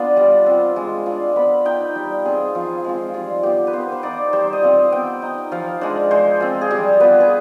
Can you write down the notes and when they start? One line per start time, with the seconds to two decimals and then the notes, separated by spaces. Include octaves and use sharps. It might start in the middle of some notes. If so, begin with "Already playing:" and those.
Already playing: B3 D4 F4 C6
0.17 G3
0.46 C4 F4
0.76 G#3
1.06 D4 F4
1.36 B3 B5
1.65 D#4 G5
1.95 G3
2.25 C4 F4 G#4
2.55 F3 F4
2.85 G#3 C4 F4
3.14 G3 F4
3.43 B3 F4 G4
3.67 B4
3.73 B3 C5
3.92 C5
4.03 D#4 D5
4.33 G3 C5
4.53 D#5
4.63 C4 F4
4.92 B3 G5
5.22 D#4
5.52 F3 F5
5.81 G#3 D4 C5
6.11 G#3 C5
6.41 C4 F4
6.61 G#4
6.71 G3 G4
7.00 B3 F4 B4
7.20 G#4